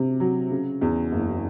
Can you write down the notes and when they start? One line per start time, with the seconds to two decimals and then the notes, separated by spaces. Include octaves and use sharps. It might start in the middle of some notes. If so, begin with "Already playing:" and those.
Already playing: C3
0.20 F#3
0.51 C#3
0.81 E2
1.12 F#1